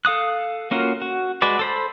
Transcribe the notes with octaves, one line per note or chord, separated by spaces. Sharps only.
A4 F5 D#6 F#6
A#3 C#4 F4 F#4 A#4
F#4
G#3 F#4 B4 D5
A4 C5 B5